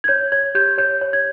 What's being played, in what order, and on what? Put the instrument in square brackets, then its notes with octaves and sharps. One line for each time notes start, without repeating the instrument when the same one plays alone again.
[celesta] G#6
C#5 G6
C#5 G#6
G4 G6
C#5 G6
C#5
G#6